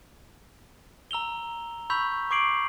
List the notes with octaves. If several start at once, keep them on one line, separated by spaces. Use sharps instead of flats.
A#5 E6 F7 G7
B5 C#6 E6 G6 B6 F7
C#6 D6 G#6 C7 D7 F#7